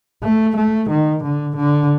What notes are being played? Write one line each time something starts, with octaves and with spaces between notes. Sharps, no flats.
A3
A3
D#3
D3
D3